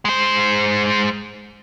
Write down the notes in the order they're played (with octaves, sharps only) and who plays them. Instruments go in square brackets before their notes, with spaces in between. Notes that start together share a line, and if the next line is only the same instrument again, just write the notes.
[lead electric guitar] G#3 C5